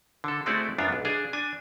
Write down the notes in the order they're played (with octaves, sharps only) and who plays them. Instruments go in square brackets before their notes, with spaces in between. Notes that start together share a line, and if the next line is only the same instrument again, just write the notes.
[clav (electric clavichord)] D3 A4
G#3 A3 C4 E4 F#4 D5
F#2 B3 D4 F4
B1
D4 G#4 F5
D4 G#5